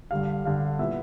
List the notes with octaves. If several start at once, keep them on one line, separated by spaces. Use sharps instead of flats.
G2 D3 G3 F5
G2 D3 G3 F5
A#2 G3 B3 E4 E5